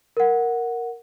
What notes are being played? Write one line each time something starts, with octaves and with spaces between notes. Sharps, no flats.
A#4 F#5